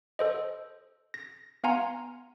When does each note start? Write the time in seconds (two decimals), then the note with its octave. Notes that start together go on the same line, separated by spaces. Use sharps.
0.19 A4 C5 D#5
1.14 A#6
1.64 B3 F5 F#5 G#5 A#5 C6